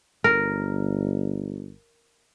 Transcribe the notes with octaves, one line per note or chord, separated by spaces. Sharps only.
G1 A#4